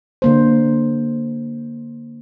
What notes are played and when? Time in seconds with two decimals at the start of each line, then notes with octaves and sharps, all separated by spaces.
0.22 D3 A#3 C5